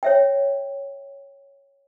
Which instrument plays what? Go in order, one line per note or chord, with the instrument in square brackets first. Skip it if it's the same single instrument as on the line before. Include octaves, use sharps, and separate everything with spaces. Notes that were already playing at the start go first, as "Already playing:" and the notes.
[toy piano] C#5 E5 G5